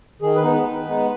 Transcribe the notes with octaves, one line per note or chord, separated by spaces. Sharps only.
D#3 G#4
B4
G#3 B3 D#4
B4
D#3
G#3 B3 D#4